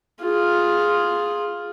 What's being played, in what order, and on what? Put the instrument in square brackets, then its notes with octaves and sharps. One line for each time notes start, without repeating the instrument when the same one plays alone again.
[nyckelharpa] F4 G#4